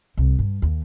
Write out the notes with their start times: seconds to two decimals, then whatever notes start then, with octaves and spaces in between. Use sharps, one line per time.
0.17 C2
0.39 G2
0.62 D#2